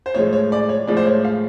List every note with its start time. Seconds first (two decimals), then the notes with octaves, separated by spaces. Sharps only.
0.06 C5
0.14 A2 F3 G#3 C#5
0.33 C#5
0.52 D5
0.69 C#5
0.87 A2 F3 G#3 D5
0.97 C5
1.07 C#5
1.25 F5